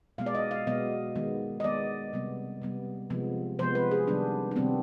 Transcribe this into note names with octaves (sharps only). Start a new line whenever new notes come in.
B2 G#3 B3 F5
D5
D#5
F5
B2 G#3 B3 D#5
D#3 G#3 B3
D#5
D#3 G#3 B3 D5
C3 G3 B3
C3 G3 B3
C3 F3 G#3 B3
C3 F3 G#3 B3 C5
B4
G#4
C3 D#3 G3 B3 D4
D4
C3 D#3 G3 B3 C4